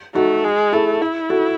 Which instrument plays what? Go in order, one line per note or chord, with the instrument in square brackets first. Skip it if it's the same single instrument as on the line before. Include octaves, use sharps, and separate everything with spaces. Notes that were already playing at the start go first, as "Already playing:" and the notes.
[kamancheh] A3 [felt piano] D#4 F#4
[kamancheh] G#3
[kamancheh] A3 [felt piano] E4 G#4
[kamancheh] E4
[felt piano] F#4 A4